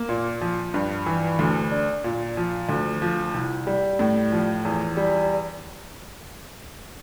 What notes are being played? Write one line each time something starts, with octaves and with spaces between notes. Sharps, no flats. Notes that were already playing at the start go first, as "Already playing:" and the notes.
Already playing: A#3
A#2
F3
G2
E3
D2
D4
A#2
F3
D2
F3
C2
G3
A2
F3
E2
G3